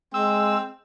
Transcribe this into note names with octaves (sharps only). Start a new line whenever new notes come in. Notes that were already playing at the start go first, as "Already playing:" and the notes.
G#3 C4 E6